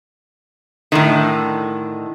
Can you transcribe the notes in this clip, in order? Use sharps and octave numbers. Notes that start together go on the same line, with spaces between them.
A2 D3 D#3